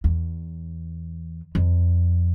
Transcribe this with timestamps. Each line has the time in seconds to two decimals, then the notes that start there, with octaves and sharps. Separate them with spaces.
0.04 E2
1.55 F2